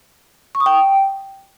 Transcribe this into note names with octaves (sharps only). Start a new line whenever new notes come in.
C#6
D#6
G5